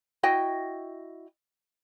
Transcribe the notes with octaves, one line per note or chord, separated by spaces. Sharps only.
E4 F#4 D#5 G5